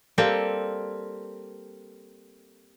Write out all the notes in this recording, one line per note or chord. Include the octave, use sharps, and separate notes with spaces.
G3 A#3 C4 G4 A4